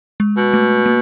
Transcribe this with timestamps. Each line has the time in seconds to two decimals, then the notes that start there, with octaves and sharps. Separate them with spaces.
0.20 G#3
0.37 B2
0.54 A3
0.86 A#3